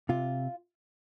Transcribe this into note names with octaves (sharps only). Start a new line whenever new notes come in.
C3 F4